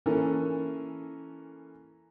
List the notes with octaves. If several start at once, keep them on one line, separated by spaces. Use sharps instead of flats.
E3 A#3 C#4 A4 A#4